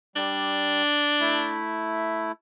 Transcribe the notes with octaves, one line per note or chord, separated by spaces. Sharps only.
G3 D4
A3 E4